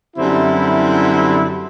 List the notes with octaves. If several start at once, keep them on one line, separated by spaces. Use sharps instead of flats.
F#2 D3 G3 C4 E4